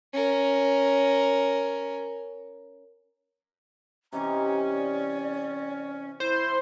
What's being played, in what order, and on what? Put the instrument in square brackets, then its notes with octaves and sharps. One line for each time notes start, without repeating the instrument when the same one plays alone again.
[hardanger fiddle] C#4 A#4
[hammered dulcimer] C3 E3 D#4 [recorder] C#4 [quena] A#5
[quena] D5
[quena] E4 [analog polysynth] C5